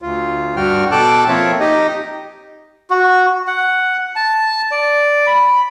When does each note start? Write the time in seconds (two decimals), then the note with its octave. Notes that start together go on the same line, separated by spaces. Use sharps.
0.02 D2 F4
0.56 G2 G3 F#4 G5 F6
0.92 B2 A4 G5 A5 D6 F#6
1.28 F3 A#3 C4 F4 C#5 E5
1.60 D#4 G4 D#5
2.90 F#4
3.47 F#5
4.16 A5
4.71 D5
5.27 B5